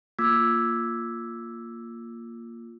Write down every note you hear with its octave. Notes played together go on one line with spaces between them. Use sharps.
A#3 F4 D6 E6 G#6 B6